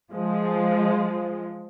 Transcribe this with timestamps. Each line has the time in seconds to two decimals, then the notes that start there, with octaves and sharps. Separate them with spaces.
0.13 F3 G#3